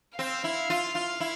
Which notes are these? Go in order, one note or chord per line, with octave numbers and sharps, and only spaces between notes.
C4 F5
E4
F4
F4
E4